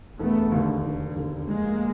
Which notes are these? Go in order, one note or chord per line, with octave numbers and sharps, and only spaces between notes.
E1 A3 B3
D#2 D3
E1
D#2 D3
F1 G#3 A#3